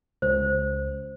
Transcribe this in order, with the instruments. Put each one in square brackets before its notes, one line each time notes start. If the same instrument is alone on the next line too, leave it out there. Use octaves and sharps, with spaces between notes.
[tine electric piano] C#2 [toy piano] C5